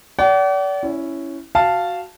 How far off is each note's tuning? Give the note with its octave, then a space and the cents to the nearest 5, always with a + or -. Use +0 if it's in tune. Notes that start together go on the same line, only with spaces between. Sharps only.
D5 -35 F#5 +45
C#4 +0 E4 +0
F#4 +0 F5 -10 A5 +0